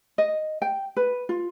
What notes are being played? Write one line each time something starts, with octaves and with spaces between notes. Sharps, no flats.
D#5
G5
B4
F4